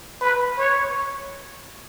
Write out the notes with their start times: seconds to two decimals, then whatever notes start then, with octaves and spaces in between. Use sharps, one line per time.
0.21 B4
0.58 C#5